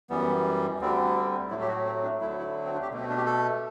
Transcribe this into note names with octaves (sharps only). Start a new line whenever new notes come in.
F#2 E3 G3 B3
D2 D3 G3 C4
C4
A2 F#3 A3 E4
G4
F#4
C4
D4
D2 D3 F#3 A3 E4
E4
C4
D4
G4
B2 A3
C4
D4
G4
A4